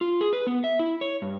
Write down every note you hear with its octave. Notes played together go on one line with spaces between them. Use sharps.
F4
G#4
B4
B3
E5
E4
C#5
G2